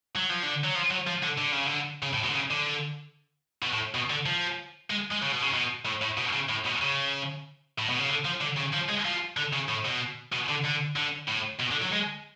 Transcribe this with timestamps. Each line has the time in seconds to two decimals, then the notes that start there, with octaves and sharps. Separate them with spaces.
0.16 F#3
0.30 F3
0.43 D3
0.64 F#3
0.75 F3
0.91 F#3
1.07 F3
1.23 D3
1.38 D3
1.52 C#3
1.66 D3
2.03 C#3
2.13 A2
2.24 B2
2.30 D3
2.35 C#3
2.50 D3
3.62 B2
3.73 A2
3.94 B2
4.10 D3
4.26 F3
4.90 G#3
5.11 G#3
5.22 C#3
5.32 B2
5.42 C#3
5.54 B2
5.86 A2
6.02 A2
6.18 B2
6.33 C#3
6.49 A2
6.66 B2
6.82 C#3
7.79 A2
7.89 B2
7.99 C#3
8.09 D3
8.25 F3
8.41 D3
8.57 C#3
8.73 F3
8.89 G#3
9.05 F3
9.37 D3
9.53 C#3
9.69 A2
9.85 B2
10.32 B2
10.48 D3
10.64 D3
10.96 D3
11.28 A2
11.60 B2
11.71 D3
11.82 F#3
11.92 G#3